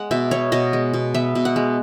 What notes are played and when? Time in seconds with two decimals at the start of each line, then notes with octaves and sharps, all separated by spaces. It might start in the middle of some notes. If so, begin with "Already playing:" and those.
Already playing: G#3 F#5
0.11 B2 E5
0.31 B3 C#5
0.52 B2 D#5
0.73 G#3
0.94 B2
1.14 B3 E5
1.35 B2
1.45 F#5
1.56 G#3